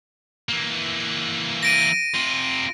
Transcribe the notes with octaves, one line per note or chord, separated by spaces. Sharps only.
E3 A#3
A#6 D7 D#7
C3 F4